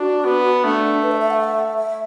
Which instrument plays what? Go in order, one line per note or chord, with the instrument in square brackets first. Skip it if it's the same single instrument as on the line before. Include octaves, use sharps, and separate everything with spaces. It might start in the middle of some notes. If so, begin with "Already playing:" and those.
Already playing: [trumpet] D4 [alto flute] F#4
[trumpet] B3
[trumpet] A3 [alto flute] D4
[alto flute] B4
E5
E5
F#5
E5
E5